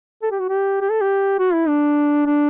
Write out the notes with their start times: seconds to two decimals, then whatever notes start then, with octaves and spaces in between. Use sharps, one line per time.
0.23 A4
0.31 G4
0.39 F#4
0.49 G4
0.81 G4
0.91 A4
1.01 G4
1.39 F#4
1.53 E4
1.68 D4
2.26 D4